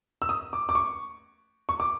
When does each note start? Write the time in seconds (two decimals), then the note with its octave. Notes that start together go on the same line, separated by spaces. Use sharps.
0.22 E6
0.29 D#6
0.53 D6
0.69 D6
0.75 C#6
1.69 C#6
1.80 D6